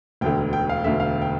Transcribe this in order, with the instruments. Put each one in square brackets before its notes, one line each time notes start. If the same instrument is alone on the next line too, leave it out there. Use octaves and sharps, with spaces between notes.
[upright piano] E1 D2 D3 G5
G5
F5
E1 D2 D3 E5
F5
G5